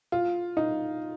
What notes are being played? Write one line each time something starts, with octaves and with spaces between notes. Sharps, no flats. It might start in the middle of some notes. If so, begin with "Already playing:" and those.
F4
D#4